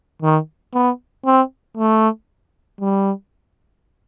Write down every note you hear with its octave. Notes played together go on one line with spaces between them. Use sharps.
D#3
B3
C4
A3
G3